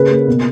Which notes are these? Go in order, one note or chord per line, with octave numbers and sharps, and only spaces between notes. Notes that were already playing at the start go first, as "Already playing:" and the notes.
Already playing: C#3 A#3 B4
A#3
B2